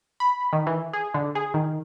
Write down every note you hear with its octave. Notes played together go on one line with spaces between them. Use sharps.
B5
D#3
E3
G#4
D3
G#4
D#3